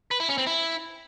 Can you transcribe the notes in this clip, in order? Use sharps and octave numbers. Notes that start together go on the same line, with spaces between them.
B4
E4
C#4
C4
E4